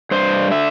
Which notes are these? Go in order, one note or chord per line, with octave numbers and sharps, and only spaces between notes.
G2 C5
D3 E5